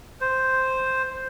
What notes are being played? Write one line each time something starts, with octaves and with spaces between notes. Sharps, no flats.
C5